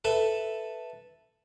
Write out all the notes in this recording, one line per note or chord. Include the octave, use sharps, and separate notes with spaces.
A4 B4 E5